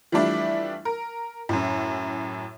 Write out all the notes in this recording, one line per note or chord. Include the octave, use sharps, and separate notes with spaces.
E3 F3 G3 A3 D4 E4
A#4
F#2 A2